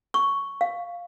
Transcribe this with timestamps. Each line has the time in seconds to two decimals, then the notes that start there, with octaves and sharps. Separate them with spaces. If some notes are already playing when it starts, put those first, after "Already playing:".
0.14 C#6
0.61 F5